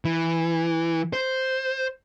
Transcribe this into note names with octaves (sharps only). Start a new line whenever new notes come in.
E3
C5